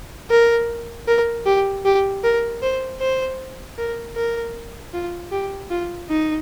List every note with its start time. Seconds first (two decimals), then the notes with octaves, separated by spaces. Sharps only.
0.30 A#4
1.08 A#4
1.46 G4
1.85 G4
2.24 A#4
2.63 C5
3.00 C5
3.78 A#4
4.16 A#4
4.94 F4
5.32 G4
5.71 F4
6.10 D#4